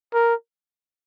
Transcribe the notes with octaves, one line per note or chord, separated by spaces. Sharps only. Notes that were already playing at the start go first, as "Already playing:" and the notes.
A#4